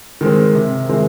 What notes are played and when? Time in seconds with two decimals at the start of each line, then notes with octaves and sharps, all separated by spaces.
0.21 D#3 G#3 C4
0.54 C3
0.89 D#3 G#3 C4 E4